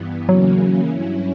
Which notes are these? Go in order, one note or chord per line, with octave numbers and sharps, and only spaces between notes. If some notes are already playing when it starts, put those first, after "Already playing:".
Already playing: G2 E3 B3
E2 C#3 E3 F#3 A#3 C#4
G2 F#3 C#4 E4